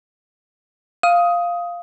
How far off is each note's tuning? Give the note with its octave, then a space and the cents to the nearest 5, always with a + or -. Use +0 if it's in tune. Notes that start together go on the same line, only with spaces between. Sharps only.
F5 +0 D#6 +15